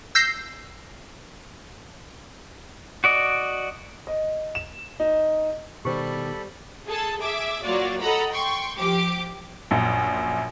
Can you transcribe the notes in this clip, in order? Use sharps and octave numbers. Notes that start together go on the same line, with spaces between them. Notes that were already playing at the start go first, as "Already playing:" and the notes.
E6 G6 A#6 C7
F#4 D5 D#5
D#5
E7
D#4
B2 D#3 G3 G4 A4 C5 B5
G#4 A4 A5
G#4 E5 D6
F#3 A#3 F4 F#4 D5
A4 D#5 F#5 A#5 B5
G5 C6 C#6
F3 G4 D6
A#1 F#2